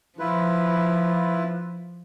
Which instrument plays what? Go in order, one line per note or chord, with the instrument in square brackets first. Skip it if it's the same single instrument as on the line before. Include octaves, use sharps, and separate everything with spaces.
[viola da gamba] F3 [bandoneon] E4 F4 B4